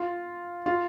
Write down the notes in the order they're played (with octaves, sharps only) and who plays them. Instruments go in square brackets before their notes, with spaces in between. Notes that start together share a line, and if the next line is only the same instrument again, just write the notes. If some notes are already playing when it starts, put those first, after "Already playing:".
Already playing: [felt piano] F4
F4